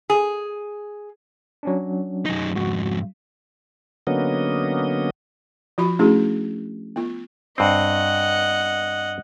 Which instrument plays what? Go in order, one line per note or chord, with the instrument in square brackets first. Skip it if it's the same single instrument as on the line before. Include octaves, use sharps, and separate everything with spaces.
[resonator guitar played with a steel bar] G#4
[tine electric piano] F#3 C#4 D4
[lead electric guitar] F#2 D#4
[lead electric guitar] F2 G#2 [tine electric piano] F#4
[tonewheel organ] D3 F#3 A#3 B3 C#4 D#5
[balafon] F3 F4 F#4 B5
A3 C#4 D4 E4 F#4 G#4
B3 F4
[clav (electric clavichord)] G2 C4 [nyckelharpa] D#5 F#5